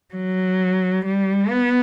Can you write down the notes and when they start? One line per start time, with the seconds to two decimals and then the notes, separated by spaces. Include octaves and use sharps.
0.14 F#3
1.05 G3
1.50 B3